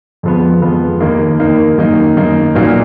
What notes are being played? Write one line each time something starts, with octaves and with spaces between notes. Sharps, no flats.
F2 F3 G#3 B3
F2 F3 G#3 B3
D#2 D#3 A#3 D#4
D#2 D#3 A#3 D#4
F#2 D#3 A#3 D#4
F#2 D#3 A#3 D#4
B1 A#2 F#3 A#3 D#4